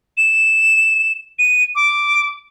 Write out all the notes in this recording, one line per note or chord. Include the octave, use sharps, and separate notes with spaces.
E7
D#7
D6